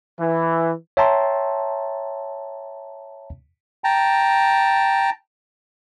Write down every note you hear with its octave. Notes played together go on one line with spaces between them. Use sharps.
E3
C#5 E5 G5 A5 A#5 C6
G5 A5 A#5